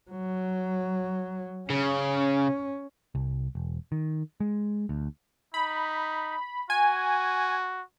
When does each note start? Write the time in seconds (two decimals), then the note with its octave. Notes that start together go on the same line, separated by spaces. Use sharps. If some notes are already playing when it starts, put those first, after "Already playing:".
0.11 F#3
1.70 C#3 C#4
3.15 C2
3.55 E1
3.92 D#3
4.40 G#3
4.89 D2
5.54 D#4 B5
6.70 F#4 G#5